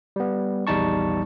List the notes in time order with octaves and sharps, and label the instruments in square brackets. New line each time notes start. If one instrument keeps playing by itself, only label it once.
[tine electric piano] G3 B3
A#1 E2 G3 D#4 A5 C#6